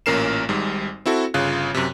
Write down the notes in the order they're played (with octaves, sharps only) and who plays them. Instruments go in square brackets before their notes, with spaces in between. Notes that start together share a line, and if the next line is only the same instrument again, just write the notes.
[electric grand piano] A1 A#2 C#4 A#4 C7 E7
G#1 G#2 G3
C4 E4 F#4 A4
G1 C#3 F4 F#6
F#2 C3